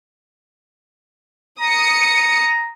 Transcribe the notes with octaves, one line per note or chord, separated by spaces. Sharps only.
A#5 D#6 C#7